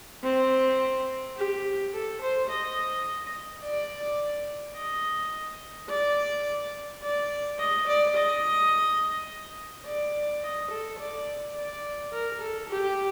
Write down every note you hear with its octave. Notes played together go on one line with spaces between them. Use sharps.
C4
G4
A4
C5
D#5
D5
D#5
D5
D5
D#5
D5
D#5
D5
D#5
A4
D5
D5
A#4
A4
G4